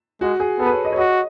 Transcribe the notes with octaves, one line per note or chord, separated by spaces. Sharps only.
G#3 F#4
G#4
B3 A4
B4
C#5
D#5
C#5
F#4 D#5